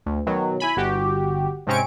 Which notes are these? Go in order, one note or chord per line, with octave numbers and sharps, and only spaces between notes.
D2
B2 D#3 F#3
E4 G#5 B5
G1 F#4 G4
G#2 C3 C4 C#4 C#6 D7